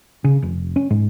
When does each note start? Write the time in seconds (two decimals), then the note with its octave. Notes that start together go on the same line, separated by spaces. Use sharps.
0.24 C#3
0.42 F1
0.76 C#4
0.90 G#2